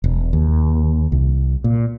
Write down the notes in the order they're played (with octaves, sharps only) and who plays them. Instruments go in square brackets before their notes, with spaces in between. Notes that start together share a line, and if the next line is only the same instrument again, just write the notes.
[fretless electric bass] E1
D#2
C2
A#2